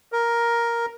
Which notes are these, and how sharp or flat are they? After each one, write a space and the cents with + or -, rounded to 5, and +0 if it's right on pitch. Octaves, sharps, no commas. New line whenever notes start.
A#4 +5